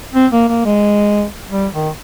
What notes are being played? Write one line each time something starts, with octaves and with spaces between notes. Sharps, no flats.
C4
A#3
A#3
G#3
G3
D#3